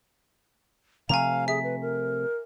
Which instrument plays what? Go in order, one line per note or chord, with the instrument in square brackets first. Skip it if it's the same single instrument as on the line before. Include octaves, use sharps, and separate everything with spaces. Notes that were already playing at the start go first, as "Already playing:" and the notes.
[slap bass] C3 F3 A3 [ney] F5 [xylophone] G#5 A#5
[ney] G#4 [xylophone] E5
[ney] B4
A#4